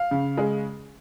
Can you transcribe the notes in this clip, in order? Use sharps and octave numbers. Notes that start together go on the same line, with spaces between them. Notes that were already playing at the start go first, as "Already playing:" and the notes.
Already playing: F5
C#3
G#3